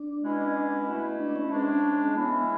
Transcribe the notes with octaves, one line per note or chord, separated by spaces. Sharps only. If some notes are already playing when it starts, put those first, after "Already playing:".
Already playing: D4
B2 G#3 C#4 E4
B2 A3 E4
D4
C#4
G#2 G#3 D4
C#3 E3 G#3 B3 C#4 E4